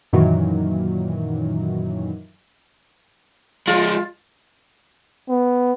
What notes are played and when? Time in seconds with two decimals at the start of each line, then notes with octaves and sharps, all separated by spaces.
0.13 F#2 A#2 D#3 E3 F#3
3.67 F3 G#3 F4
5.29 B3